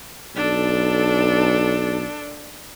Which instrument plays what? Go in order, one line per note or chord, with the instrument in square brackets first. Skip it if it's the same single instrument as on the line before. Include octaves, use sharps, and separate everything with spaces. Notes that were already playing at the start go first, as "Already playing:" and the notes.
[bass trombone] B1 [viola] D4 A4